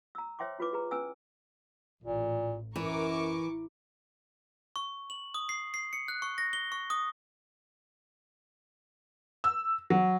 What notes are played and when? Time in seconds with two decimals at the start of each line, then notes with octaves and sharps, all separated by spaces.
0.15 A#5 E6
0.39 C5 C#5 E5 G5 C6 D6
0.59 E4 F4 B4 D6
0.73 G#4 B4 A#5
0.91 C#4 B4 G#5 E6
2.04 A1 A#2
2.76 F#2 E3 A#4 C#6 D6
4.76 C#6
5.10 F#7
5.34 D#6
5.49 C7
5.74 C7
5.93 C#7
6.08 F#6
6.22 C#6
6.38 A#6
6.53 G7
6.72 C#6
6.90 D#6
9.44 E6
9.90 F#3